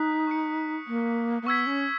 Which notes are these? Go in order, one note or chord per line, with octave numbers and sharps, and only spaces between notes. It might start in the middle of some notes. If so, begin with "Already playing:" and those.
Already playing: D#4 D#6 F#6 B6
C#6 F#6 C#7
A#3
A#3
B3 C#6 E6 G#6 B6
C#4